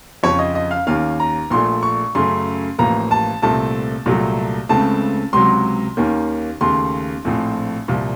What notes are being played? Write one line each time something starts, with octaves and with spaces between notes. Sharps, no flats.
F2 C#3 F3 C#5
D#5
D#5
F5
D#2 D#3 A#3 C#4 F5
A#5
A#1 A#2 A3 C6
C#6
F#2 C#3 A3 C6
A1 A2 F3 A#3 A#5
A5
C2 A#2 A3 C4 A5
C2 A#2 F#3 A3
C#2 C#3 A3 C4 A5
C#2 C3 F#3 C6
D#2 D#3 A#3 C#4
D#2 C#3 A3 C6
A#1 A2 F3 A3 C4
C2 A#2 F3